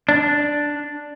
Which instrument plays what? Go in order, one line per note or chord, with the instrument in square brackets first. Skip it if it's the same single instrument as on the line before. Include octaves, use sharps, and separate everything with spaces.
[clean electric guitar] D4